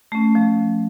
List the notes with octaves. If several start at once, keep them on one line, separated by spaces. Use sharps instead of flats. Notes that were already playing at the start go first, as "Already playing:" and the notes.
A3 C#4
F3